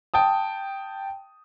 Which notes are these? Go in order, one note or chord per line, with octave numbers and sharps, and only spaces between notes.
G5 A5 D#6